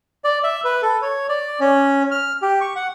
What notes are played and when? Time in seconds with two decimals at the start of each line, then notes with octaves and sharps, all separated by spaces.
0.24 D5
0.44 E5
0.64 B4
0.82 A4
1.02 C#5
1.29 D5
1.60 C#4
2.11 F6
2.42 G4
2.61 C#6
2.76 F#5